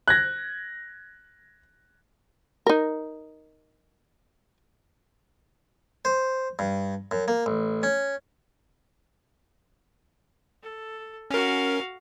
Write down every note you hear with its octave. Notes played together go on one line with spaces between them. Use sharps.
F#6 G#6 A#6
D#4 A#4
C5
G2
F#2
A#3
A1
C#4
A4
C#4 F#4 A#4 F5